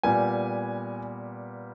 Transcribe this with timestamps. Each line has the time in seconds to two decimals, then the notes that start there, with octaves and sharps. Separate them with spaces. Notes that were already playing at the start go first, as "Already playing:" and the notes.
0.03 A#2 G3 B3 G#5